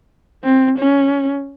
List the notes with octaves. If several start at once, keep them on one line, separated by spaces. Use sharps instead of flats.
C4
C#4